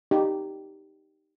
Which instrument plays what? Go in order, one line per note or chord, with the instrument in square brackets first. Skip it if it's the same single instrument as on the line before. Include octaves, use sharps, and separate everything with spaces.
[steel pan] D#4 G4